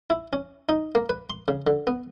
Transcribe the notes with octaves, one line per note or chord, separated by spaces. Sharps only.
E4
C#4
D#4
A#3
B4
C6
C#3
D3
B3